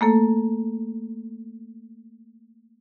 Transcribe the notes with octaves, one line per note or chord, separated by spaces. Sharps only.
A3 A#3 A4